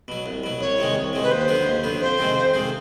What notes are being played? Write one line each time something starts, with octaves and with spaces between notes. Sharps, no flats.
B2 F#3
C2
B2 F#3
C2 C#5
C3 D#3 G#3
C2
C3 D#3 G#3
B4
D#2 C5
D3 F#3 B3
D#2
D3 F#3 B3
F2 C5
C3 D#3 G#3 C4
F2
C3 D#3 G#3 C4